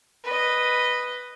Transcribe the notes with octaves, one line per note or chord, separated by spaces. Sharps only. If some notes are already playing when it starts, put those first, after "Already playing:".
B4 D#5